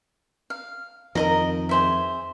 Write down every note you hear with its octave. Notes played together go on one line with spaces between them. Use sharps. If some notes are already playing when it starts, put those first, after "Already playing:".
F5
F2 D#3 A#4 D#5 A#5
G#4 C5 E5